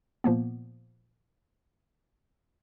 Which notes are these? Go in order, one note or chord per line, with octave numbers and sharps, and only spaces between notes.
A#2 F3 A#3 B3